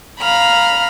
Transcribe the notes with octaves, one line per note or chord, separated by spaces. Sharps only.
F5 A#5 B5 F6